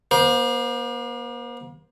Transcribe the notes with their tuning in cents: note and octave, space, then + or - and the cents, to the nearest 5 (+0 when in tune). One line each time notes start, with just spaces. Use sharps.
A#3 +45 C5 +0